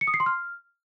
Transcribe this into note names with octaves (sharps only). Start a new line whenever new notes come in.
C#7
D#6
C7
C6
F6